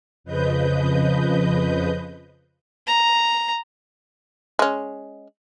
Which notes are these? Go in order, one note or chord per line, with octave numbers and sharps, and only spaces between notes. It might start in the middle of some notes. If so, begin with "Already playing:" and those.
F2 C#3 F3 B4 D#5 G6
A#5
G#3 C#4